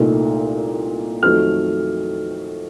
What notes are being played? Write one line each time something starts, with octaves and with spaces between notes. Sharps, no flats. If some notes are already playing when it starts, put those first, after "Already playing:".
Already playing: C2 A#2 A3 D#4
F2 D#3 F#3 A3 F6